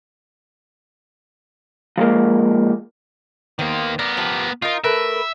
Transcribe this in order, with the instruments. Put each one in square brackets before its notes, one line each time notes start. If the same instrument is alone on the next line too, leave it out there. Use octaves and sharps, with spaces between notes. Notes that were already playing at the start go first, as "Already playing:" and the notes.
[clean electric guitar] F3 G#3 A#3
[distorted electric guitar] D#3 A#3 [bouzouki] B3 C5
[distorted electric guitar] B3 A#4 [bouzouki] D5
[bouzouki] F3 G4
[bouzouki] D#4 A#4 [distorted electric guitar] F4
[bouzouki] A3 A#4 B4 [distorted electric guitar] E5